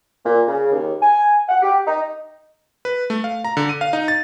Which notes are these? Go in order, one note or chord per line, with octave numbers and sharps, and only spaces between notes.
A#2
C#3
D#2
G#5
F#5
G4
D#4
B4
A3
F5
A#5
D3
D#7
F5
D#4
A6